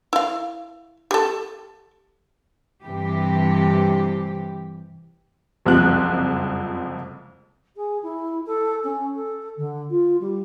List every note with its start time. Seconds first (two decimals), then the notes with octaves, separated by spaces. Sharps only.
0.13 E4 F5
1.11 G4 A4
2.84 G2 C3 E3 G4
5.66 F#1 C2 F2 F3 G#3 F#6
7.76 G#4
8.02 E4
8.46 A4
8.83 C#4
9.14 A4
9.56 D3
9.90 F4
10.20 G3